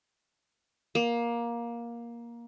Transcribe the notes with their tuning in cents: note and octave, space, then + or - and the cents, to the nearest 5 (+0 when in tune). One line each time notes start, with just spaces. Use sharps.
A#3 +15